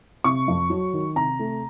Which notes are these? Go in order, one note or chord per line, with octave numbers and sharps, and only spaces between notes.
C3 C#6
F2
F#3
D#3
C3 A#5
A3